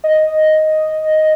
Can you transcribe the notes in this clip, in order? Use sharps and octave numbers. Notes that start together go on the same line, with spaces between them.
D#5